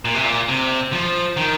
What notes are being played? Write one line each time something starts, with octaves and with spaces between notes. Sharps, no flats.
A#2
C3
A#2
C3
F3
D#3